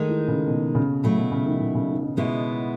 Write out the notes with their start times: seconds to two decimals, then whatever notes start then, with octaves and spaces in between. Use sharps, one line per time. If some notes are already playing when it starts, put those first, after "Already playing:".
Already playing: D#3 G#3 A3 D#4
0.09 E3
0.28 C#3
0.47 B2
0.75 C#3
1.04 C#3 F#3 A3 E4
1.18 B2
1.31 C#3
1.46 D#3
1.61 C#3
1.75 C#3
1.89 D#3
2.03 D#3
2.17 B2 G#3 B3 E4